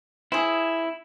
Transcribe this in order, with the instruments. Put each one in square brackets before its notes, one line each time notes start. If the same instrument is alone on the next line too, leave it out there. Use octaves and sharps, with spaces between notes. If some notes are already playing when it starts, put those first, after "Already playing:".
[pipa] C4 G#4 [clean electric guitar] E4